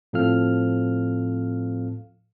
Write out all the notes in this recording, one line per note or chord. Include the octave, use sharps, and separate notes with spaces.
A2 F3 C4 A4 F5 F6